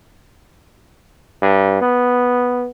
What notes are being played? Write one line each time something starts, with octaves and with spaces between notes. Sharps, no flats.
G2
B3